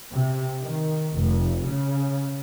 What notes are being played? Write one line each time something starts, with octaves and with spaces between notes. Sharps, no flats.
C3
D#3
F1
C#3